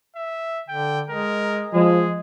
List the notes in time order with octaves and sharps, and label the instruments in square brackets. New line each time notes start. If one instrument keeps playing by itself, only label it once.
[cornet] E5
[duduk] D3 [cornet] G5
[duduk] G#3 [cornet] A#4
[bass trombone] F3 [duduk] G#3 [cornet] G#4